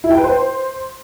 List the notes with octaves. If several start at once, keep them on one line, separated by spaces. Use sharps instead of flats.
E4
G5
B4
C5